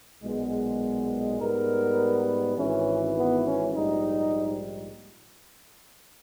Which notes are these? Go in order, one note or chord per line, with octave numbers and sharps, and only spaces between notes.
B1 A#2 G#3 B3
G#2 G3 B3 A#4
G#1 G#2 E3 C#4
B3
C#4
A#1 G#2 G3 D#4